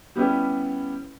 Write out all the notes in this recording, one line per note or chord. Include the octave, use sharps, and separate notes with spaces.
G3 B3 C#4 E4 G4